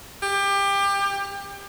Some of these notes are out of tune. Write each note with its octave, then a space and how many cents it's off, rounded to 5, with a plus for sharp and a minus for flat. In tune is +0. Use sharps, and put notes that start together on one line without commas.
G4 +25